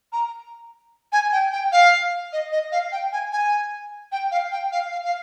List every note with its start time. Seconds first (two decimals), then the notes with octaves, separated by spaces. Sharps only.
0.13 A#5
1.12 G#5
1.32 G5
1.52 G5
1.72 F5
2.33 D#5
2.52 D#5
2.72 F5
2.92 G5
3.12 G#5
3.32 G#5
4.12 G5
4.31 F5
4.52 G5
4.72 F5
4.91 F5
5.04 F5